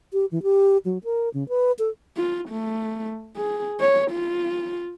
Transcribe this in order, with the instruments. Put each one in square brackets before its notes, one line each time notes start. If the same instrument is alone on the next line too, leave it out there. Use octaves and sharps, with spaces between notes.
[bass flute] G4
E3
G4
F#3
A#4
C#3
B4
A4
[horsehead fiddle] F4
A3
G#4
C#5
F4